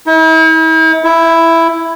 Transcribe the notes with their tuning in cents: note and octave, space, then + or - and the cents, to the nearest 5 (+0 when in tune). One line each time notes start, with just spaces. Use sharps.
E4 -45
E4 +5